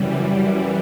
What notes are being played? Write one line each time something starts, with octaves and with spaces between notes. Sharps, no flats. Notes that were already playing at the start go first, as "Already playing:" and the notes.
Already playing: F#2 C#3 E3 G3